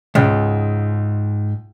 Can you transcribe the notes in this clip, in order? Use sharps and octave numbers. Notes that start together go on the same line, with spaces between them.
C#2 G#2